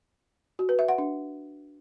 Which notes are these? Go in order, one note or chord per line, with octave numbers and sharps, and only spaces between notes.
F#4
B4
E5
F#5
D4